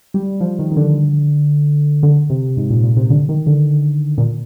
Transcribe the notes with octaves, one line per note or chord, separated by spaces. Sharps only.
G3
F3
D#3
D#3
D3
D3
C3
G#2
A#2
A#2
C3
D3
D#3
D3
A#2